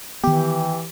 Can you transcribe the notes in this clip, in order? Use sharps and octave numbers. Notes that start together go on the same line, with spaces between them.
D#3 E3 B3 G4